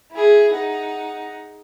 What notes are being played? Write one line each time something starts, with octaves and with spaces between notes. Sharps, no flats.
E4 G#4
D#4 F#5